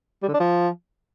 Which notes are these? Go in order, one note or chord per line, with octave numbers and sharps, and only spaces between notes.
G3
D3
D4
F3